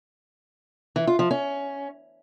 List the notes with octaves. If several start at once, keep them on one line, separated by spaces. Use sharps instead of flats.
E3
F4
F3
C#4